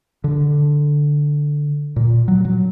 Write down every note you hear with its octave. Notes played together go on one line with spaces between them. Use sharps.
D3
A#2
F#3
F#3